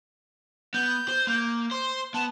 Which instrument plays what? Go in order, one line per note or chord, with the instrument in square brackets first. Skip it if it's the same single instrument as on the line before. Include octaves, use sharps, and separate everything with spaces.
[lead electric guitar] B3 [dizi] G6
[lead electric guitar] C5
A#3
[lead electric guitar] C5 [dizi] C6
[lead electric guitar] B3 [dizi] A5